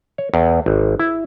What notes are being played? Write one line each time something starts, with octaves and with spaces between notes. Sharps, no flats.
C#5
E2
G#1
E4